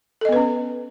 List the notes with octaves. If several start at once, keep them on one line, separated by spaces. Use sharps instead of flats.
B3 C#4 A4 B4 D#5